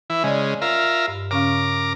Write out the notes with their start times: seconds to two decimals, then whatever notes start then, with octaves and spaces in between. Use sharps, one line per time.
0.10 E3 E4
0.24 C#3 G#3 D5 D#5
0.62 F4 A#4 E5
1.08 G2
1.31 C#3 C#4 A#4 F5 D6